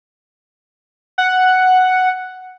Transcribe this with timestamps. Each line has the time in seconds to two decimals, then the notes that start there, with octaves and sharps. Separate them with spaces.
1.18 F#5